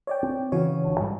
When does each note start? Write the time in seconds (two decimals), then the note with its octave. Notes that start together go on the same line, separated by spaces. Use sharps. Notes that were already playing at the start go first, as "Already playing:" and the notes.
0.07 C#5 D5 G5
0.23 C4
0.52 C#3 E3 F#4 C#5
0.84 F1 D3
1.00 G#2 G3 G#3